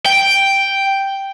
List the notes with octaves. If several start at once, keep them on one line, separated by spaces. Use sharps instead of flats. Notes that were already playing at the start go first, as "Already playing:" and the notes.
G5